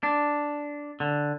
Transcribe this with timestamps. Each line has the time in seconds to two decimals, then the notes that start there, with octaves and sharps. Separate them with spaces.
0.03 D4
1.00 D3